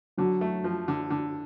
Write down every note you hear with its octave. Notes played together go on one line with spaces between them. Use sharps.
D3 F#3
A3
F3
D3
D3